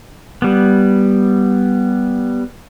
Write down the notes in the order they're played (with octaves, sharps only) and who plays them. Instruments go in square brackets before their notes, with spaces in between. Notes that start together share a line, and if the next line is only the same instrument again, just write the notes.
[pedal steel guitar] G3 B3